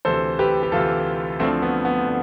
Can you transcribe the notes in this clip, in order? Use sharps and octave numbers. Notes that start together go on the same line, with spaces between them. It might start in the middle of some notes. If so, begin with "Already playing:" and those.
D2 C3 E3 A4 C5
G4 B4
G4
D2 C3 E3 F4 A4
D2 D3 F3 A3 C4
B3
B3
D3